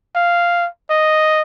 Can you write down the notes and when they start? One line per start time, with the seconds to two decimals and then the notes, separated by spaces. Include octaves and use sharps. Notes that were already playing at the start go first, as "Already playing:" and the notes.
0.16 F5
0.90 D#5